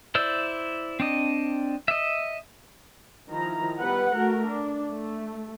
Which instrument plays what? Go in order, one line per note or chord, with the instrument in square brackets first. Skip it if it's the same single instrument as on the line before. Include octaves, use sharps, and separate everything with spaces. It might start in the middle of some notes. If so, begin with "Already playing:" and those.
[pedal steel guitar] E4 C5 D5 E6
C4 D4 D#5
D#5 E5
[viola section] D#3 F3 E4 A#5
G3 B3 B4 F#5
A3 F#4 A#4
D4
A3